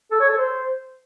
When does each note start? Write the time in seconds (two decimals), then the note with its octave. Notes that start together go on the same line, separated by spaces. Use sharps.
0.11 A4
0.20 C#5
0.29 A4
0.37 C5